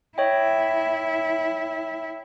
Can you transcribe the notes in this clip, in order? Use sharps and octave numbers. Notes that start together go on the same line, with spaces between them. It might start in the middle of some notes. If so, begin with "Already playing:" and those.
E4 C#5 D#5 G5